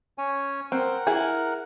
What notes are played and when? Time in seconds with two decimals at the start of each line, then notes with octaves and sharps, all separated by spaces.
0.18 C#4 C#5 G#5
0.72 C4 A#4 F#5
1.07 E4 G#4